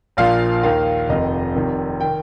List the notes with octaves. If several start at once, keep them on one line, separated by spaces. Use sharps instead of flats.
A#1 A#2 F3 F5
D#2 D#3 F5
F1 F2 D#3 D#5
F1 F2 C3 D#3
D#3 G5